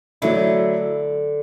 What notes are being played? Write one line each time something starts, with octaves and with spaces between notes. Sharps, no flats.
D3 F#3 A3 E4